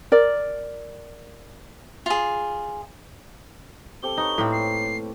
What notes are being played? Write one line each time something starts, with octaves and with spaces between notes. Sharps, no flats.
A#4 D5
F4 G#4
C4 G4 A4 G7
D#4 B4 C#5
A2 A#3 C4
C7